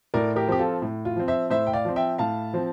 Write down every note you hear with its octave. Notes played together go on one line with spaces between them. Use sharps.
A2 A#4 D5
G4 A#4
F3 C4 G4
F4 A4
A2
F4
F3 C4
C5 E5
A2 C5 E5
G5
D5 F5
F3 C4
E5 G5
A2 F5 A5
F3 C4